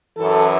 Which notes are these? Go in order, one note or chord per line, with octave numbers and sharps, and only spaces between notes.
F#2 E3 A4